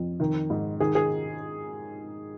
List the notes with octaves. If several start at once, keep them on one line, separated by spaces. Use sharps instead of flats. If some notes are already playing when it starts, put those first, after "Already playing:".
Already playing: F2
D#3
G#2
D#3 G#4
G#4